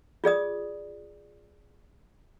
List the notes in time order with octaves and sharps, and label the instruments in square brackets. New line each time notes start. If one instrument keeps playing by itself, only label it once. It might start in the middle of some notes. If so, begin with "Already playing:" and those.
[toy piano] F4 G#4 D5 D#6